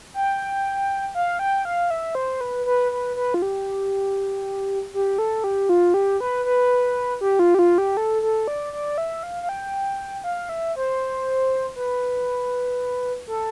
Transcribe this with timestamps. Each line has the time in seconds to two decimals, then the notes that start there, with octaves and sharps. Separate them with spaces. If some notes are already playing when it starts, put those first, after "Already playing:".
0.14 G5
1.15 F5
1.39 G5
1.65 F5
1.90 E5
2.15 C5
2.41 B4
2.66 B4
2.92 B4
3.16 B4
3.34 F4
3.42 G4
4.94 G4
5.18 A4
5.44 G4
5.69 F4
5.94 G4
6.20 B4
6.45 B4
7.21 G4
7.39 F4
7.54 G4
7.59 F4
7.78 G4
7.97 A4
8.22 A4
8.48 D5
8.73 D5
8.98 E5
9.23 F5
9.43 F5
9.49 G5
10.24 F5
10.49 E5
10.75 C5
11.76 B4
13.27 A4